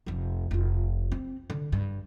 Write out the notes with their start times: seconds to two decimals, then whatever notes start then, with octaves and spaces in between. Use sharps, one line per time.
0.06 F1 F2
0.51 F1 F4
1.12 C4
1.50 D3
1.72 G2